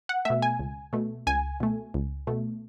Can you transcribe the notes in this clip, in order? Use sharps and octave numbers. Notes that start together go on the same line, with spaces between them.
F#5
B2 A3 E5
G#5
C#2
B2 A3
C#2 G#5
B2 A3
C#2
B2 A3